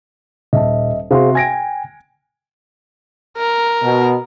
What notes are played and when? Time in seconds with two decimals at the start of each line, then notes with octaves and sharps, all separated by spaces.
0.53 D#1 D#5 E5 A5
1.11 C3 F#4 G#4 C5 F5 C6
1.35 G5 G#5 G#6 A#6 D7
3.37 A#4
3.83 B2